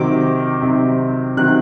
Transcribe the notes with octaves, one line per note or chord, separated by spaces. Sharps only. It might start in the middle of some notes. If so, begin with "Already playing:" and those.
Already playing: C3 D#3 F#3 C4 D6
C3 D#3 F#3 C4
C3 D#3 F#3 C4 F#6